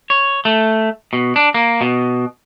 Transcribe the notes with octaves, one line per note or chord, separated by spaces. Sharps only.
C#5
A3
B2
D4
A#3
B2